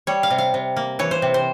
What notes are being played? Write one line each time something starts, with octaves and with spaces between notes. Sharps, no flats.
G3 C#5
F5
C3
F5
C3
A#3
E3 C#5
C5
C3
C5